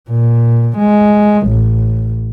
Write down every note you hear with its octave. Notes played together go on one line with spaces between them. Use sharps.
A#2
G#3
A1